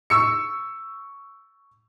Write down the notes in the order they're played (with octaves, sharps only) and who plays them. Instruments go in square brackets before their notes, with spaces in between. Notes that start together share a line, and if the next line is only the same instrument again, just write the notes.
[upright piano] C#6 E6 C#7